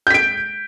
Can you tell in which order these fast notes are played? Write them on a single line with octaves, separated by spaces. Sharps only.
G6 B6 D7